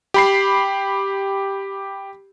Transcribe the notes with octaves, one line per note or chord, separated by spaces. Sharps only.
G4 B5 C7